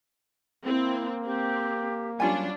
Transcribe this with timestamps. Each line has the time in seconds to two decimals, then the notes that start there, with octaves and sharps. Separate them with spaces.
0.66 A#3 C4 E4
1.24 C4 G4
2.20 F#3 G3 C#4 D4 F4 G#5